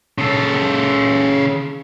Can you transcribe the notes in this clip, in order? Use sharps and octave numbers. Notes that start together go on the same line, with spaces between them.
C#3 A4